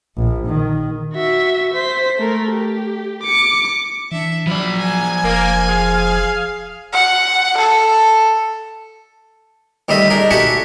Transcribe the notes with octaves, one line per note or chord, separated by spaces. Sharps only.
A#1
D#3
F#4 E5
C5 B6
A3 A#4
G4
D6 C#7
E3 D4 E5
F3 F#3 D5 B5
G#5
F1 A#3
G#4 F5
F#5
A4
D#2 G3 A3 D#5 E5
D4 D#4 G#4 A#4
F#4 G4 A4 E5 F#5 G#5